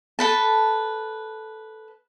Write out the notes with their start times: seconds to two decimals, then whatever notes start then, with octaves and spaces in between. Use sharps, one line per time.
0.19 A4 B4 A5